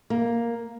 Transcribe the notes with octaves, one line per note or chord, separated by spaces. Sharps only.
A#3